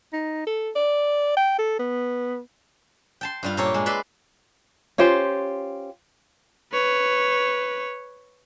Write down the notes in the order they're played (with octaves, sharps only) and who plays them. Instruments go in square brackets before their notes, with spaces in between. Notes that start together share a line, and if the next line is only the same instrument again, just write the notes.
[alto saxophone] D#4
A4
D5
G5
A4
B3
[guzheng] G5 A5 C6
G2 G3 F4
A#2 A#3 G4 A4 C#5
G#3
B4 D5 E5 B5 C6
[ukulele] C#4 F4 G4 C5
[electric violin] B4 C#5